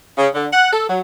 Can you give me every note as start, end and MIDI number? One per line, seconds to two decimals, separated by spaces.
0.17 0.28 49
0.35 0.47 50
0.52 0.71 78
0.72 0.85 69
0.89 1.00 54